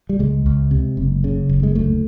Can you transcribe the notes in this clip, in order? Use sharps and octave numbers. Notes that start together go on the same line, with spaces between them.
G3
C#2 G#3
C#2
C3
F#1
C#3
F#1
G#3
D2 A3